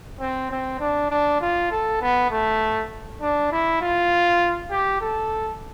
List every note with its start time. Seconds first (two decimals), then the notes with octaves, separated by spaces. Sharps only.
0.20 C4
0.51 C4
0.80 D4
1.10 D4
1.41 F4
1.71 A4
2.01 B3
2.31 A3
3.21 D4
3.52 E4
3.81 F4
4.71 G4
5.01 A4